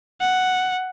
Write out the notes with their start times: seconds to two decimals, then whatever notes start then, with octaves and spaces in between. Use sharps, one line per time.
0.21 F#5